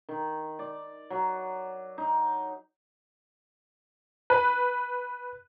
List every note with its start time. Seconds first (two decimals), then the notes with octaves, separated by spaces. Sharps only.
0.09 D#3
0.59 D5
1.10 F#3
1.98 D#4
4.30 B4